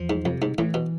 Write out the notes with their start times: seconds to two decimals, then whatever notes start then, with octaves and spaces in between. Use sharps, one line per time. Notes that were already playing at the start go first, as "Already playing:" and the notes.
Already playing: E2 F3
0.10 G#2
0.25 F2 C3
0.42 G#2
0.58 A2 E3
0.74 B2